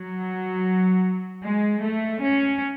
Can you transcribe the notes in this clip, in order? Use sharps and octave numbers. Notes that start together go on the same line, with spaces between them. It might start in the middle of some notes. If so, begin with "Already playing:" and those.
Already playing: F#3
G#3
A3
C#4